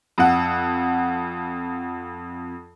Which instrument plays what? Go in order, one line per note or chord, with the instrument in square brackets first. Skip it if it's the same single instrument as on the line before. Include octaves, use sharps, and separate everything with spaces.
[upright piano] F2 F#5